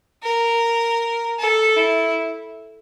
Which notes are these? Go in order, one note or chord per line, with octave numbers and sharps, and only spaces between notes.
A#4
A4
E4